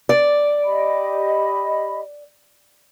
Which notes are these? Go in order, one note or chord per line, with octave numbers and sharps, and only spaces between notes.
D5
G4 D#5 B5